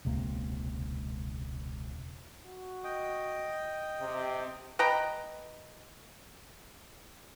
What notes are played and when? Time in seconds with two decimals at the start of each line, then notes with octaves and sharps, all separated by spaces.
0.05 E1 C#2 C3 A#3
2.47 F#4
2.84 D#5 G5
4.01 C3
4.79 B4 D#5 G5 A#5